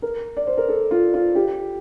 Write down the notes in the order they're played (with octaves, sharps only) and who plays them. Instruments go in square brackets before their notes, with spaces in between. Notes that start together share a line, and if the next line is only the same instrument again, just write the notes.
[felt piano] A#4
D5
C5
A#4
A4
F4
F4
G4